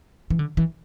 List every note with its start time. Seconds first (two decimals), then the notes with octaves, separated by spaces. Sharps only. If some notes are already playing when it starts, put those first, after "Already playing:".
0.30 E3
0.39 D3
0.57 E3